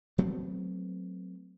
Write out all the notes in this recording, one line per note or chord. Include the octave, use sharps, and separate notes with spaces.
F#3 A3 B3 C4